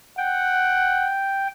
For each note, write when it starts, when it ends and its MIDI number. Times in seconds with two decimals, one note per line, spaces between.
0.18 1.09 78
0.18 1.48 79